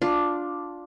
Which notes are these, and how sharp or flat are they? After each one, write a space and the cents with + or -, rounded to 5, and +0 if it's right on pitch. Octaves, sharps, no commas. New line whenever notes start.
D4 +0 F4 +10